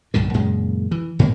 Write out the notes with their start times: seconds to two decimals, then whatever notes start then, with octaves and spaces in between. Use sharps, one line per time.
0.14 B1 G2 A#2 D3
0.34 F#2 A#2 C#3 G#3
0.91 E3
1.19 G#2 B2 D#3 A#3